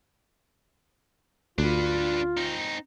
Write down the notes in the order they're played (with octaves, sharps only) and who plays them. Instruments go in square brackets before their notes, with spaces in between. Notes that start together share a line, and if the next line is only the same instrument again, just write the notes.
[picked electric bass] D2 [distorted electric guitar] D4 B4 [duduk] F4
[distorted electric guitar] C4 D#4